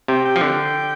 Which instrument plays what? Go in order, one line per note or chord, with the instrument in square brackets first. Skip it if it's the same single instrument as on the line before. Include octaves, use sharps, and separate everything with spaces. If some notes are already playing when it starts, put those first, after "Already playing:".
[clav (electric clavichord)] C3 [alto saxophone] G5
[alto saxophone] G5
[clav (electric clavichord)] F3
D3